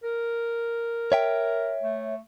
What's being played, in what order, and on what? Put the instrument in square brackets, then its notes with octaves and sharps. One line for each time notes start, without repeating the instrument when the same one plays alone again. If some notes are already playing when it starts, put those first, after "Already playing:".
[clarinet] A#4
[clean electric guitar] C#5 E5 G5
[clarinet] A3